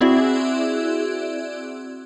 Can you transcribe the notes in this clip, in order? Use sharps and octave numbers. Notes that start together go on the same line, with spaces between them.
C4 E4 F#4 G#4 D5 E5